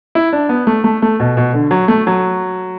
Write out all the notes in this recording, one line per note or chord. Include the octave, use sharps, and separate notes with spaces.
E4
D4
B3
A3
A3
A3
B2
B2
D3
F#3
A3
F#3